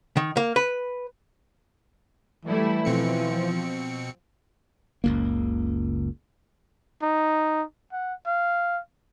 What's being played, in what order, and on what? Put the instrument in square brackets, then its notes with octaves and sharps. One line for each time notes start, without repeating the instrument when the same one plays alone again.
[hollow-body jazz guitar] D#3
A#3
B4
[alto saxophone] E3 [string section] G3 A3 E4
[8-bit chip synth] B2 C4 C#7 [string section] F3
[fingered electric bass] F#1 C#2 A#3
[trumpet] D#4
F#5
F5